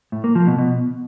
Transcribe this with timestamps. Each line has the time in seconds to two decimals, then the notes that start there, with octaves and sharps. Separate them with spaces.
0.12 A2
0.24 A#3
0.35 F3
0.47 B2
0.59 B2